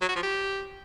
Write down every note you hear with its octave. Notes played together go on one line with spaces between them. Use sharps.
F#3
F#4
F3
G4